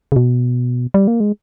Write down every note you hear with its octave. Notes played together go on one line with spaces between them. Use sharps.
C#3
B2
G3
A#3
G#3